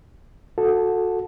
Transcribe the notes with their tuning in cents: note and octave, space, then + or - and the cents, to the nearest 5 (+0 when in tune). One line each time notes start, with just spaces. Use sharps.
F#4 -25 A4 +0